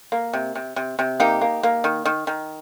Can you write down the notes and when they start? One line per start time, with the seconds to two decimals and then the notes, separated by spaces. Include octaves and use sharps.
0.12 A#3
0.33 C3
0.55 C3
0.76 C3
0.99 C3
1.20 A#3 D#4 G4
1.41 A#3
1.63 A#3
1.84 D#3
2.05 D#3
2.27 D#3